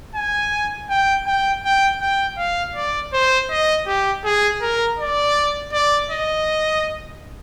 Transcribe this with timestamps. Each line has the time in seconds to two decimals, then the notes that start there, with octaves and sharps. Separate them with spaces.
0.15 G#5
0.89 G5
1.26 G5
1.63 G5
2.01 G5
2.38 F5
2.75 D5
3.13 C5
3.50 D#5
3.87 G4
4.25 G#4
4.62 A#4
4.99 D5
5.73 D5
6.10 D#5